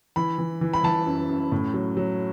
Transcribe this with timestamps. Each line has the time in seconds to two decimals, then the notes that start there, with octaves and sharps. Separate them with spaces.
0.16 E3 B5
0.38 E3
0.61 E3
0.74 B5
0.83 E3 A5
1.06 F#2
1.29 F#2
1.52 A2
1.74 F#3
1.97 F#3